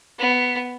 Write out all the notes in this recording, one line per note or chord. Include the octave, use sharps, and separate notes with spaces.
B3